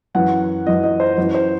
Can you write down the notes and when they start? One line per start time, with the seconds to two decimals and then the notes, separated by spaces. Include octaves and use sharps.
0.14 F#2 E3 F#5
0.66 F#2 E3 D#5
0.84 D#5
1.00 C5
1.18 F#2 E3 B4
1.35 C5